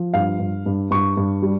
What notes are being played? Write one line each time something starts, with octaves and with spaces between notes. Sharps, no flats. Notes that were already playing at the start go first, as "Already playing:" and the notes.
Already playing: F3
G2 F5
G2
G2
G2 C#6
G2
G3